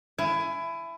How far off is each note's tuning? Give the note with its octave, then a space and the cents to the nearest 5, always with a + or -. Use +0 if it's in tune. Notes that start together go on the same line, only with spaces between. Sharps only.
E4 +20 G#5 +15